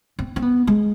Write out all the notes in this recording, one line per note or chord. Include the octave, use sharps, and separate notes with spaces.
C4
C4
B3
G#3